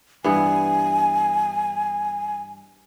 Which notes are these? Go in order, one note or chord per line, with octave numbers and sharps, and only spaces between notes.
G2 E3 B3 G#5